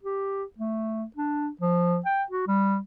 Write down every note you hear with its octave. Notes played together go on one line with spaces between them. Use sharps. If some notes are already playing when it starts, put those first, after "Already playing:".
G4
A3
D4
F3
G5
F#4
G3